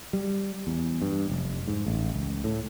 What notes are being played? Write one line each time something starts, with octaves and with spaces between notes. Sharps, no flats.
G3
E2
G2
F1
G#2
A1
C#2
A2